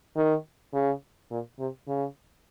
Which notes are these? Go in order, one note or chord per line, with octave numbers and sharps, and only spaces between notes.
D#3
C#3
A#2
C3
C#3